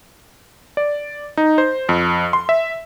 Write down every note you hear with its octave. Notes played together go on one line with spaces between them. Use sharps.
D5
D#4
C5
F2
C6
E5